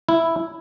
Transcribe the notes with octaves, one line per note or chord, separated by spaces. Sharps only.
E4